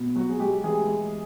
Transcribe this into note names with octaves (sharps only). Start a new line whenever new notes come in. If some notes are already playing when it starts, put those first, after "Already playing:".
Already playing: B2
F#3 F#4
G#4
G#3 G4
E3 G#4
G#3